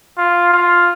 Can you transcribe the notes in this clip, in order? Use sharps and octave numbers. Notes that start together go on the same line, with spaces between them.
F4
F4